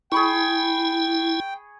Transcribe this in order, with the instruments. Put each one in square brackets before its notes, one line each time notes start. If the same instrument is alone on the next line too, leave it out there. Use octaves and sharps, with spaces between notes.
[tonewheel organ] E4 [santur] G#4 B5 C#6 [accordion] G5